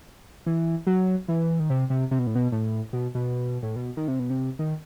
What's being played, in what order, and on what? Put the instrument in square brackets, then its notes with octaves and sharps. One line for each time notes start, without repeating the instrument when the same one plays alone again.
[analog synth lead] E3
F#3
E3
D#3
C3
C3
C3
B2
A2
B2
A2
B2
B2
A2
B2
D#3
C3
B2
C3
D#3